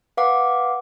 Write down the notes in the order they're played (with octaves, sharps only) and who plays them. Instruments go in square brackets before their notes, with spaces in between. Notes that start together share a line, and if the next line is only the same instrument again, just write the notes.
[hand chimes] B4 F5 F#5 D6